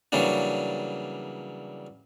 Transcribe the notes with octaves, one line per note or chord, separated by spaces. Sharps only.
C#3 E3 F#3 G3 A#3 D4